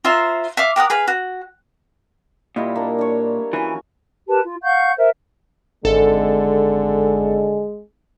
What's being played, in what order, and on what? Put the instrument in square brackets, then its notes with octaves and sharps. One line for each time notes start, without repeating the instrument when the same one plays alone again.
[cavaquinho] F4 C5 E5 A#5
E5 F5 D6
G4 A#4 F#5 D#6
G#4 B4 F5
F#4
[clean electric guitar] A#2 [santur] G3 E4 D#5
[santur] A#3 D4
D4 C#5
[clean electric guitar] E3 [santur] C#4 F#4 C#6
[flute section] G4 A#4 B4 A5
F4
F5 F#5 C#6 G6
A#4 C5 E5
[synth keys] G#1 A4 [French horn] D3 [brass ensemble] G#3